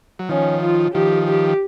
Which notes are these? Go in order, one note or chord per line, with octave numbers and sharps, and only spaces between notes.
F#3
D#3 F3 C#4
F4
D#3 F3 G4
G4